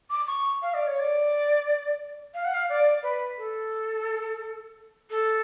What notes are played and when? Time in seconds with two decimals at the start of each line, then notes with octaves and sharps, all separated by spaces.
0.10 D6
0.27 C#6
0.62 F5
0.73 D5
0.86 C#5
0.99 D5
2.34 F5
2.44 F#5
2.53 F5
2.69 D5
3.02 B4
3.37 A4
5.09 A4